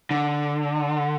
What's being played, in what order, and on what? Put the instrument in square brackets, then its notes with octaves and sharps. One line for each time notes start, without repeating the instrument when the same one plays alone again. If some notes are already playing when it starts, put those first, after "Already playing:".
[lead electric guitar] D3